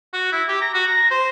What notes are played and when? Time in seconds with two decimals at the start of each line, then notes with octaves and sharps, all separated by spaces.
0.13 F#4
0.32 E4
0.48 G4
0.61 A#5
0.74 F#4
0.87 A#5
1.11 C5